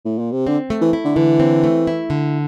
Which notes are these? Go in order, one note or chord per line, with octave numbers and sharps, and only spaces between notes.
A2
A#2
C3
D3 C4
A3
E3
E4
D3
D3 E3
C4
A3
E4
D3